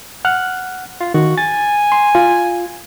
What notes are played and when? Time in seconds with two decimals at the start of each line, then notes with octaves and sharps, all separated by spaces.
0.25 F#5 F6 F#6
1.01 F4
1.14 D#3 F#4
1.38 G#5 A6
1.92 C6
2.15 F4